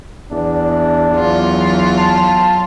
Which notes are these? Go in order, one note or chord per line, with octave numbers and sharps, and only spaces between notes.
E2 D4
E2 F#3 F4
A5